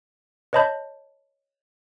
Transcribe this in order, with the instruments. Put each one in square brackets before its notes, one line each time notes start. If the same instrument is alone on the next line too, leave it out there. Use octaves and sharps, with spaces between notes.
[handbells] B4 C#5 D#5 A5 B5 G6